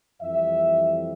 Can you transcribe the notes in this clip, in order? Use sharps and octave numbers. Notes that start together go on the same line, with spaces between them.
F2 E3 G3 E5